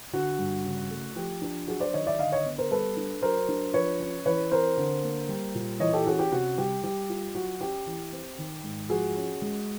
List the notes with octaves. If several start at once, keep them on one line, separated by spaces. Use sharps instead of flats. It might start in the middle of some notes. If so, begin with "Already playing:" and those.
D3 F#4
G2
C#3
A3
F3 G4
D4
F#3 F#4 G#4
C5 D5
D#3 C#5 D#5
D5 E5
D3 D#5 F5
C#5 D#5
B3
A#4 C5
G3 A4 B4
D4
F#3 A#4 C5
D4
F3 B4 C#5
C#4
E3 B4 C#5
C4 A#4 C5
D3
A#3
G3
A#2
E3 C#5 D#5
G4 A4
C#4 F#4 G#4
G4
C3 F#4
G3 G4
G3 G4
F4
F#3 F#4
C#4 G4
E3
C4
D#3
G#2
F3 F#4 G#4
C#4
G#3